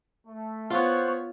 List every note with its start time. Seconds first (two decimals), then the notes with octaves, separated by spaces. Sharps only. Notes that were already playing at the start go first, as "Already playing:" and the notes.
0.27 A3
0.70 B3 F4 C5 C#5 F#5